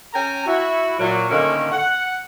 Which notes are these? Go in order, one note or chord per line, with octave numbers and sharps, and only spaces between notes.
C#4 G5 G#5 A#5
E4 F#4
A#2 F#3
A2 D3 D#3 A#3 C4 C#4
F#5